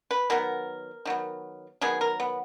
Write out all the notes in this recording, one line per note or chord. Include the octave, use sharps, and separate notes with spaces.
B4
D#3 F#3 B3 A#4
D#3 F#3 B3
D#3 F#3 B3 G#4
A#4
B3